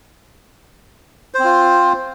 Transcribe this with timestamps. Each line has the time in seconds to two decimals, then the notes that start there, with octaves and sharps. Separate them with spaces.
1.34 C5
1.39 C4
1.44 F4